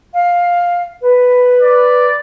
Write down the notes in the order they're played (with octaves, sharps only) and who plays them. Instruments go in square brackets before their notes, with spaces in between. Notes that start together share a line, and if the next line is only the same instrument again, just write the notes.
[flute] F5
B4
[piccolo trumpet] D5